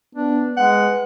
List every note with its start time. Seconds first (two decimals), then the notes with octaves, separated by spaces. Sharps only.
0.15 B3 D4
0.57 G#3 B4 F#5